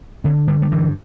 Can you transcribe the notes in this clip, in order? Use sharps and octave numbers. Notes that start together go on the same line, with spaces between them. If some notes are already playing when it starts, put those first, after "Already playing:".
D3 C4
D3 G3
G3
G2 E3